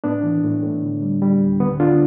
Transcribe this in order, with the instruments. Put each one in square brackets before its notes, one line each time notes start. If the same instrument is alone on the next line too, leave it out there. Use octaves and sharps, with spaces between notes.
[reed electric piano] A2 B3 D4
E3
A2
A2
D3
G3
G3
D2
D3 B3
D3 D4 F4